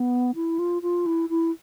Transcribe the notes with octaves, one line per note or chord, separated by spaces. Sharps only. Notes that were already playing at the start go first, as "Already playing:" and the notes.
Already playing: B3
E4
F4
F4
E4
E4